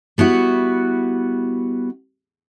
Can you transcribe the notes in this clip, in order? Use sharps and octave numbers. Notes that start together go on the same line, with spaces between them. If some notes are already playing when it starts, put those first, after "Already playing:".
G3 B3 E4 F#4